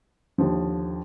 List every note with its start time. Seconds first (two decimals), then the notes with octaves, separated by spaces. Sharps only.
0.38 D#2 D3 F3